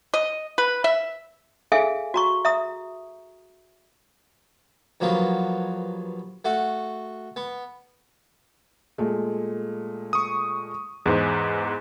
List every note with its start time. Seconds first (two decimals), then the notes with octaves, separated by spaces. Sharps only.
0.14 D#5
0.58 B4
0.84 E5
1.72 G#4 A4 E5 F5 G#5
2.14 F#4 A#5 C#6
2.45 E5 A#5 D#6
5.00 G2 F3 F#3 A#3 B3
6.45 A3 F#4 F#5
7.36 B3
8.98 A#2 G#3 A3
10.13 C#6 D#6
11.06 E2 G#2 G#3 C5